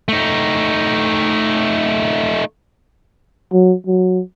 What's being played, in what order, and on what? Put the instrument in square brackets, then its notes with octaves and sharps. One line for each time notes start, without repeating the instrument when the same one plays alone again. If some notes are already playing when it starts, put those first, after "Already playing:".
[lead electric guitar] A3 D#4
[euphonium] F#3
F#3